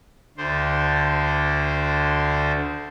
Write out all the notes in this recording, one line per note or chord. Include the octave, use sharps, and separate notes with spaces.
D2 D3 C5